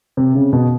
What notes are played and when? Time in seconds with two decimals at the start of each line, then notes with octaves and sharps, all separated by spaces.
0.17 C3
0.35 C#3
0.53 B2